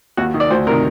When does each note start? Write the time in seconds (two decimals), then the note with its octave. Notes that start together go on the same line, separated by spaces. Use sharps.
0.17 D#2 F#4
0.34 D#3
0.40 D5
0.51 D2 C5
0.67 C3 A#4
0.71 D#3